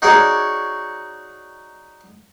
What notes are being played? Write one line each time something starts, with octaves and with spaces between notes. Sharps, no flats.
D#4 F#4 G#4 A#4 C#5 D5